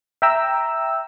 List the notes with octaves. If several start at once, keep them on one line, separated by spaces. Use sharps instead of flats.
E5 G5 A#5 E6